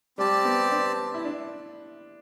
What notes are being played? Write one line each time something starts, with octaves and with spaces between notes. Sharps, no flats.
G3 C4 G4 D5 A5
B3
D4
E4
D4